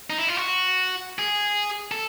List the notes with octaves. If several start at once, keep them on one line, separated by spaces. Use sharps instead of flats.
D#4
E4
F4
F#4
G#4
A4